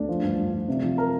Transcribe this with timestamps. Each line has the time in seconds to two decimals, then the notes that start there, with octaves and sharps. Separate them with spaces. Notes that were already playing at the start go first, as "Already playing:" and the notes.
Already playing: D2 D4
0.09 F3
0.22 G2
0.38 G2
0.53 F3
0.68 C3
0.83 F3
0.98 A#4